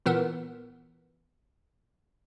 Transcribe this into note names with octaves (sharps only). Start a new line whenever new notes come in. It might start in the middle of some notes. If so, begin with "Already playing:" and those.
A#2 E3 B3 A#4